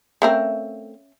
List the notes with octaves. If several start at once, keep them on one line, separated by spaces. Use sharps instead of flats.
A3 C4 C#4 A#4 E5 F5